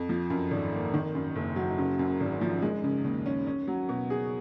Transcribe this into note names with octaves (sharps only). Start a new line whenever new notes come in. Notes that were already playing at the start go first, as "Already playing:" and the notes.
Already playing: F2
F3
F#2
G#1
A#3
D#3
F#2
F#1
F#3
C#3
F#2
G#1
F3
G#3
C#3
D#2
C#4
C#4
F#3
B2
G#4